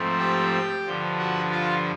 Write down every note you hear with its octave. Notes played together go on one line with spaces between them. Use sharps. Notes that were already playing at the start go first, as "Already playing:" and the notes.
Already playing: G#2 F3 A3 C4
G4 G5
G2 D3 F3
F#4 F#5
F4 F5